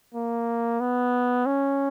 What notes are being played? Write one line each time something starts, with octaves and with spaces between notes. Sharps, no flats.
A#3
B3
C#4